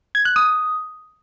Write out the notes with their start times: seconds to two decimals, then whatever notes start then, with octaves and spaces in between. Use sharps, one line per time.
0.15 G#6
0.25 F#6
0.36 D#6